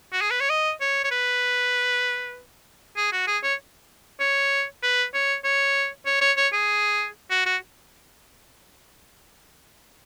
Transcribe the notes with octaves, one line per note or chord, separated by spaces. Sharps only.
F#4
G#4
B4
C#5
D#5
C#5
C#5
B4
G#4
F#4
G#4
C#5
C#5
B4
C#5
C#5
C#5
C#5
C#5
G#4
F#4
F#4